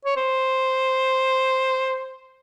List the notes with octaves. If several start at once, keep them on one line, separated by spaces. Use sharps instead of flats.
C#5
C5